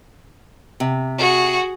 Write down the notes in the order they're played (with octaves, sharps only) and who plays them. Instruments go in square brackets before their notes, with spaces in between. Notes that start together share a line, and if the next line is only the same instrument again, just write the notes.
[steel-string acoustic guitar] C3
[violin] F#4 G#4